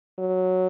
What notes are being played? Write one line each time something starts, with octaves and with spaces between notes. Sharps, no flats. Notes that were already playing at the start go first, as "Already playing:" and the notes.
F#3